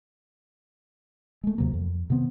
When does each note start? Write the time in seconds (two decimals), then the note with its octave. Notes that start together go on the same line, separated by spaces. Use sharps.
1.44 G#3 A3
1.58 D#2 C3 F#3 A#3
1.73 F2
2.10 C3 D#3 B3 C4